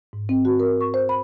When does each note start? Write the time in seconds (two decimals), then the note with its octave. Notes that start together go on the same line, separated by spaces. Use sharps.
0.13 G#2
0.29 C4
0.45 F#4
0.60 A#4
0.81 C#6
0.94 C5
1.09 B5